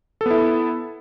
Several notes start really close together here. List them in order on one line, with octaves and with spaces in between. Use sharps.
A4 B3 E4